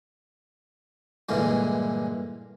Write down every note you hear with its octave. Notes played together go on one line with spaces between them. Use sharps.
G2 A#2 D3 E3 G#3